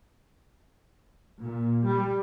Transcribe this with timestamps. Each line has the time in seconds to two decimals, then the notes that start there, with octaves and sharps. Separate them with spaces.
1.42 A#2
1.87 G3